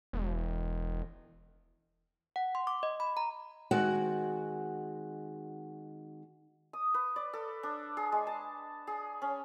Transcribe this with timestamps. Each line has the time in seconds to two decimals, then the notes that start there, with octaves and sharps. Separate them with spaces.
0.13 E1
2.36 F#5
2.55 C6
2.67 D6
2.83 D#5
3.00 B5
3.17 A#5
3.71 D#3 G#3 C4 F#4 F#5
6.73 D#6
6.94 B4
7.16 D5
7.33 A4
7.63 D4
7.97 G#4
8.12 G#3
8.27 A5
8.87 G#4
9.22 C#4